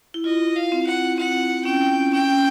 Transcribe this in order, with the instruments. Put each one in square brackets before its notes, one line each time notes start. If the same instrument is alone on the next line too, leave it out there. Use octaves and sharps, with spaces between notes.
[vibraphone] E4
[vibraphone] F4 [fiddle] D#5
[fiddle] F5
[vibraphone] C4
[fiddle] F#5
[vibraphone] C4 [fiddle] F#5
[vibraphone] C#4 [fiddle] G5
[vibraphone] C#4 [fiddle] G5